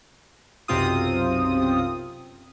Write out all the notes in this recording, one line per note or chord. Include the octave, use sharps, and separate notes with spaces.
B1 F#2 C3 C4 F4 D#6